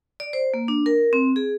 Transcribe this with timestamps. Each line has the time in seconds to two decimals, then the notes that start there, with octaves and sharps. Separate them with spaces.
0.20 D5
0.33 C5
0.54 A#3
0.68 D4
0.86 A#4
1.13 C4
1.36 G#4